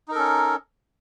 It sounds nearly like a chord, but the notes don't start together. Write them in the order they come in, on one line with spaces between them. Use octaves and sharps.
D#4 A#4 A4 C#4